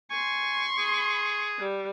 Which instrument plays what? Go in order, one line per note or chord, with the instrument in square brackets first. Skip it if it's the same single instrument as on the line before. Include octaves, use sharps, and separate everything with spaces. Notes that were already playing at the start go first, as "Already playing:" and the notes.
[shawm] G#5 [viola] C6 C#6
[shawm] G#4
[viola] G3